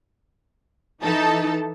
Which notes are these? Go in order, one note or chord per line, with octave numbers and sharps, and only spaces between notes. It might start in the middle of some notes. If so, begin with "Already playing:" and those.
E3 D#4 A4 A5